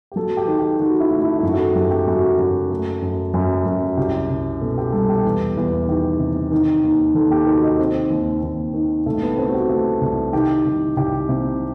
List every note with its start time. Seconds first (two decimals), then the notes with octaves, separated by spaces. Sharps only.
0.12 G4
0.16 F#3 A4
0.37 G4
0.47 D#3
0.59 G4
0.79 D#3 F#4
1.00 E4
1.11 A3
1.22 E4
1.39 E4
1.43 F#2 F#4
1.59 A4
1.75 F#2 G4
1.91 G4
2.07 F#2 F#4
2.39 F#2
2.70 A3
3.02 F#2
3.34 F#2
3.66 F#2
3.86 F#4
3.97 C2 G4
4.29 C2
4.61 B2 A4
4.78 G4
4.92 G3 A4
5.09 G4
5.25 E2
5.57 E2
5.88 D#3 G4
6.20 C3
6.51 D#3
6.84 D#2
7.15 D#2 A4
7.31 G4
7.47 D#3 F#4
7.63 D#4
7.79 D#3 C4
8.10 D#2
8.43 D#2
8.74 D#3
9.06 C2 A3
9.22 B3
9.37 A3 C4
9.49 F#4
9.54 G4
9.70 A3
10.01 C2
10.33 D#3 G4
10.65 C2
10.97 C2 G4
11.29 C3